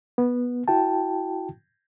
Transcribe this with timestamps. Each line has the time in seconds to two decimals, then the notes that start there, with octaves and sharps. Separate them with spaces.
0.18 B3
0.68 E4 F#4 G5 A5